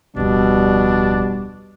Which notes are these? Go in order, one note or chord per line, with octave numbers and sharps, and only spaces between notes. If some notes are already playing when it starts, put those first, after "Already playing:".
D1 F2 B2 G3 D4